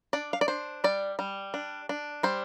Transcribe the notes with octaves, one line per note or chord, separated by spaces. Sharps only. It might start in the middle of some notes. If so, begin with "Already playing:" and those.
D4 D5
F5
D5
D4 C5
G3 D5
G3
D4
D4
G3 C5